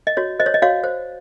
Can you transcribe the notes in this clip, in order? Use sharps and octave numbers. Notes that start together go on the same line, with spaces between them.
D#5
F#4 C#5
C5 D#5
C#5
D#5
F#4 C#5 F5
C5